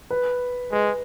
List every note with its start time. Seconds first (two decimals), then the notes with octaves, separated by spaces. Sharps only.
0.11 B4
0.73 G#3 B4